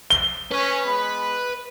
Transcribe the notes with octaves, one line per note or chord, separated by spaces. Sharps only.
G7
C#4 B4
G#3 B3 B5